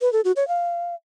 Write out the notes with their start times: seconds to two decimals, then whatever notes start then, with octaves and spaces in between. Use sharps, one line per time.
0.01 B4
0.13 A4
0.24 F#4
0.36 C#5
0.48 F5